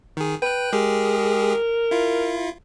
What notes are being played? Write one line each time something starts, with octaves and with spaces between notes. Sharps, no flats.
D#3 G#4
B4 G5 F#6
G#3 G4 G#4 A#4
E4 F4